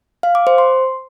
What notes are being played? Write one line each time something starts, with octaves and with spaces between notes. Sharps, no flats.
F5
D6
C5
C6